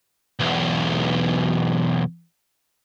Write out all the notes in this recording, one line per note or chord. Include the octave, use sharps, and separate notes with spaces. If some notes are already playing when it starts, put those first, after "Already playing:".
B1 E2